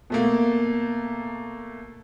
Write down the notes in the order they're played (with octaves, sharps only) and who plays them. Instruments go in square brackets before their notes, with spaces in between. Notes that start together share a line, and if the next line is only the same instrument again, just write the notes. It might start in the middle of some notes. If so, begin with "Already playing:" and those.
[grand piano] B2 A3 A#3